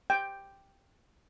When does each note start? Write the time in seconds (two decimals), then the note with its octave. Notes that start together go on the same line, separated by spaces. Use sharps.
0.10 G5